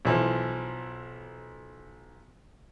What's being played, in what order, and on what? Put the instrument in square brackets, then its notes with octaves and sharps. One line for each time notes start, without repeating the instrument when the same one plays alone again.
[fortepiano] B1 E3 F3